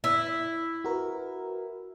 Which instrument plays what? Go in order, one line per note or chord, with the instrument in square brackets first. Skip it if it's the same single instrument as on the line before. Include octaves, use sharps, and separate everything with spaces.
[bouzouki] E4
[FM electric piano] F#4 A#4 B4